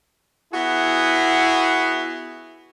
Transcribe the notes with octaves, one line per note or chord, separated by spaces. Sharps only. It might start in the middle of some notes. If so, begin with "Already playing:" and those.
B3 E4 F#4 G#4